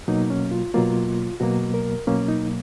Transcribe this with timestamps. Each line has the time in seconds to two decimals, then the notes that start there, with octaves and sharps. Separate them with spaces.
0.08 B2 F#3 A#3 D#4
0.30 C#4
0.51 F4
0.74 B2 F#3 A#3 F4
1.40 B2 F#3 A#3 F#4
1.74 A#4
2.07 B2 F#3 A#3 C#4
2.28 D#4